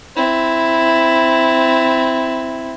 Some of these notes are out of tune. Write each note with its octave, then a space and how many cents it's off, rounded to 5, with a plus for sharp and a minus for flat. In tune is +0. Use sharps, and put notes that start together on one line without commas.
C4 -10 E4 +0